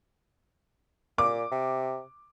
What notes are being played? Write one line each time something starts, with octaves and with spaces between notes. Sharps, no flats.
A#2 D6
C3